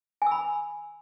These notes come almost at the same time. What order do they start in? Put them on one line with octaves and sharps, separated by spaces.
G#5 E6 B5